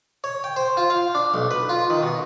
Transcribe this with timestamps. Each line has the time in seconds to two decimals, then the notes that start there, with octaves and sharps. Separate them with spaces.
0.24 C#5
0.44 G5
0.56 C5
0.77 F4
0.90 F5
1.15 D4
1.34 B1
1.51 B4
1.69 F4
1.90 D#3
2.03 B2